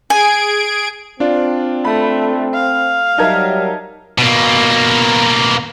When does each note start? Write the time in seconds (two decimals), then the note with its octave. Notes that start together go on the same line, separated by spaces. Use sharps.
0.10 G#4 G#5 G#6 D7
1.20 C4 D4 F4 D5
1.85 A3 B5
2.54 F5
3.18 F#3 G3 D#4 A#4 D#5 E5 A5 G#6
4.18 B2 A#3